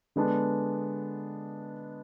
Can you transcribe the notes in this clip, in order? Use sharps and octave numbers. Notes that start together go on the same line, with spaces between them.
D3 G#3 B3 D4